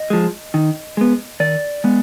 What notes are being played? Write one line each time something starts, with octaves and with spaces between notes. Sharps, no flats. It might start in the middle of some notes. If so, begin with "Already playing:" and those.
Already playing: D#5
F3 G#3
D#3
G#3 B3
D#3 D5
G#3 B3